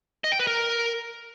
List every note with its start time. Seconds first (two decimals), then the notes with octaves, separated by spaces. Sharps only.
0.24 D#5
0.32 G5
0.40 B4
0.47 A#4